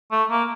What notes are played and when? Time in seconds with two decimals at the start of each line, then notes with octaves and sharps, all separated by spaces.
0.11 A3
0.30 A#3